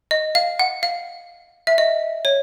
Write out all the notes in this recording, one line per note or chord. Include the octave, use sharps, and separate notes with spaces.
D#5
F5
F#5
F5
E5
D#5
C#5